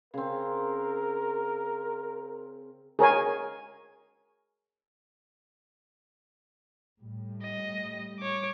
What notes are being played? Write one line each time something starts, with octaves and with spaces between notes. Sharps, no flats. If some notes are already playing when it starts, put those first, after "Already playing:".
C#3 C4 A#4
G#4 A#4 C#5 G#5
A2 G3
D#5
C#5 D6